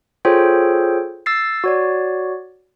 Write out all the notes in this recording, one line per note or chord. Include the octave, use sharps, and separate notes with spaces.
F4 G#4 A4 C5 C#5 G5
E6 A6 C7
F#4 C#5 D5